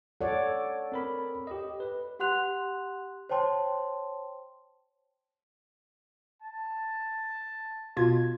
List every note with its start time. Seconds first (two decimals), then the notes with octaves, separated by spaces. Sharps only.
0.21 A4 C#5 D5 F#5
0.92 C4 A#4 B5
1.47 G4 D#5
1.80 B4
2.19 G4 F#5 C6 F#6 F7
3.29 C5 C#5 G5 A5 C6
6.42 A5
7.97 B2 F4 G#6